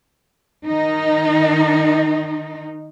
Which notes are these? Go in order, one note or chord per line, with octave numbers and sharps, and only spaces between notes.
D#3 D#4